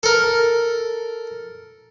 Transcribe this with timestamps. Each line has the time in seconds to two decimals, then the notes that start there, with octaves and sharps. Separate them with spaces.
0.03 A4 A#4